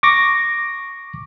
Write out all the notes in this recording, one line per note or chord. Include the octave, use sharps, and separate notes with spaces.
C#6 D6 A#6